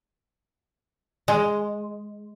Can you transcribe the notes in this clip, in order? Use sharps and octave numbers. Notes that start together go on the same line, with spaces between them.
G#3